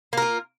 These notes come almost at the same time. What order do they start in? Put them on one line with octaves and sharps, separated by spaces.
A#3 A#4 F4